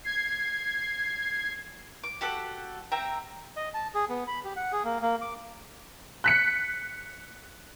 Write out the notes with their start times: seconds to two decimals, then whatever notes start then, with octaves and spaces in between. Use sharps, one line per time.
0.04 G#6 C7
2.03 D6
2.21 F#4 G4 A4 F#5
2.92 C4 E5 G5 A#5
3.56 D#5
3.74 A5
3.94 G#4
4.09 B3
4.28 B5
4.45 G4
4.56 F#5
4.72 G#4
4.84 A#3
5.02 A#3
5.21 D6
6.24 F#6 B6 C#7